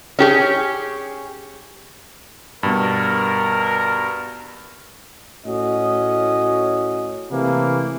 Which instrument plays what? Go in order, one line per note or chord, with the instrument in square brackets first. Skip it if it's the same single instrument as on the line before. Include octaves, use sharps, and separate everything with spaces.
[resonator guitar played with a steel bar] C#4 G4 G#4
[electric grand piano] G2 B2 [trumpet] A#4
[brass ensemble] A2 C#4 F#4 D#5
C3 E3 A3 A#3